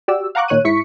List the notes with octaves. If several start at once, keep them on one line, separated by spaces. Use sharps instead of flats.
F#4 G4 D5 E6
F5 F#5 A#5 C#6 D6 F#6
A#2 D#3 C#5 F#6 D#7
G#2 E4 C#6 B6 C#7